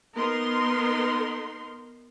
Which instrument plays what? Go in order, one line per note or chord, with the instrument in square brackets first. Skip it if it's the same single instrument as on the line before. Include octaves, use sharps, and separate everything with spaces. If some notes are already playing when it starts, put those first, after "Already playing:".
[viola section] B3 D#4 A#4 C6